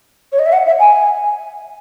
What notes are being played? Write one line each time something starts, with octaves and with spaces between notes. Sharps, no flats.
C#5
D#5
E5
F#5
E5
G#5